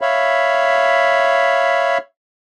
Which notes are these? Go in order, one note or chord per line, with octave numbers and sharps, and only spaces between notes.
C#5 E5 F5 B5